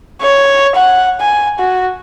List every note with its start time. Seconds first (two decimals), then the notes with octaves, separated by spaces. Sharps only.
0.22 C#5
0.75 F#5
1.20 G#5
1.59 F#4